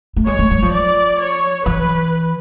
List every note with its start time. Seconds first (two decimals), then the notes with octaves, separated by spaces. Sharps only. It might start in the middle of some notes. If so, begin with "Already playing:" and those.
0.16 A3
0.27 G#3 C#5
0.39 A3
0.51 G3
0.62 F3
0.73 D5
1.21 C#5
1.66 E3 B4